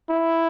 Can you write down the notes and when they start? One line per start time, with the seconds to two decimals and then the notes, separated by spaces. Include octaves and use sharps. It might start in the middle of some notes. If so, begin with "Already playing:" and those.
0.10 E4